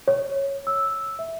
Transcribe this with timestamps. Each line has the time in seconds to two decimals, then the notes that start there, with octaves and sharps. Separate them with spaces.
0.08 C#5
0.67 E6
1.19 E5